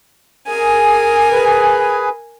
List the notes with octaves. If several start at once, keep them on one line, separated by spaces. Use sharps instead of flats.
G#4 A#4 G#5
G#4 B4